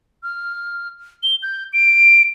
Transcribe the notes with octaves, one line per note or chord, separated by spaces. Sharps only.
F6
G7
G6
D7